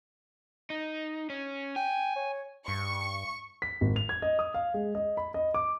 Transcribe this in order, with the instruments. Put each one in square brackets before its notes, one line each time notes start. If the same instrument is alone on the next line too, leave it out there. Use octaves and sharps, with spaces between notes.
[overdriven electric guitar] D#4
C#4
[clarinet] G5 [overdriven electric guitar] G#5
[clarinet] C#5
[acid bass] G2 [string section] C#6
[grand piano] B6
G#1
F7
G#6
D#5
D#6
F5
G#3
D#5
B5
D#5
D6